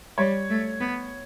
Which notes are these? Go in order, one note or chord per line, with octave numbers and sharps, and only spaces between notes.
G3 C#5
A3
B3